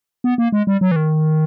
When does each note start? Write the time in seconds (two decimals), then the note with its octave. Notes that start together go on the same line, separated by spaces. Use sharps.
0.24 B3
0.38 A#3
0.52 G#3
0.67 G3
0.81 F#3
0.91 E3
0.96 D#3